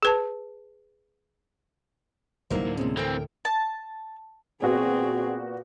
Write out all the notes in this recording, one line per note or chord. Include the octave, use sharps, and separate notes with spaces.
G#4 B4 A5
G1 C2 F#3 A#3 D#4 E4 A#4 C5
D2 A2 D3
C3 G#3 A#3 C4 C#4
E3 C4 A4 A#4 G5
A5
A#2 B3 C4 F#4 G#4